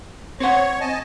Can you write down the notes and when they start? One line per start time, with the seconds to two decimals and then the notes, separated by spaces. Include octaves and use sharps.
0.40 C4 C5 C#5 F#5 C#6
0.80 D#5 G#5 A5